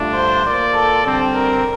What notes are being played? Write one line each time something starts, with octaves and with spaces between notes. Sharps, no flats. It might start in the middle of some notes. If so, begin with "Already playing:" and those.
Already playing: G2 D3 A3 D4 F4
C5
A#3 F4 A#4 D5
A4
D3 G3 C4
A#4